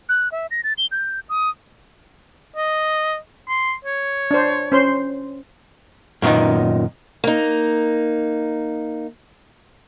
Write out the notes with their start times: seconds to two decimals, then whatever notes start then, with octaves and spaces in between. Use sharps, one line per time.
0.09 F#6
0.32 E5
0.51 A#6
0.64 A6
0.78 G7
0.92 G6
1.29 D#6
2.56 D#5
3.49 C6
3.85 C#5
4.31 D4 C5
4.72 C#4 C5 C6
6.22 F#2 A#2 D#3 B3 D#4
7.24 A#3 D#4